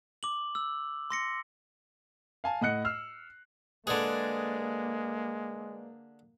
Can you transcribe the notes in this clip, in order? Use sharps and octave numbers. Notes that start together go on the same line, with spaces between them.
D6 F#7
E6
C6 A#6 C#7
F5 G#5 A5
A2 D#5 F#5 F#6 C#7
E6 F6 C7
D3 G#3 A#3 G#4 B4 D5 D7